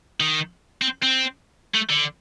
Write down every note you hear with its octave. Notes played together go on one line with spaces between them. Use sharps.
D#3
C4
C4
A3
D3